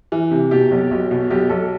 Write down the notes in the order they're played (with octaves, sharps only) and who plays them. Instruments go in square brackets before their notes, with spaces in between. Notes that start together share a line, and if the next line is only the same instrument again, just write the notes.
[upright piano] E3
C3
B2 G4
B1
B1
B2
B1 G4
B1 A4